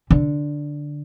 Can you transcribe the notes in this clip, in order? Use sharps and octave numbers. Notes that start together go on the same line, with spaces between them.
D3